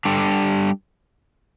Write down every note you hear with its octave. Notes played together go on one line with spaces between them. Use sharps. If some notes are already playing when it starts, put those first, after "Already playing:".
G3 D4 A4